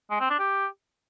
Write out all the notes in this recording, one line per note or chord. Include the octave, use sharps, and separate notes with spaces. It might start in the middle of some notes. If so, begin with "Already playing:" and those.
G#3
C4
D4
G4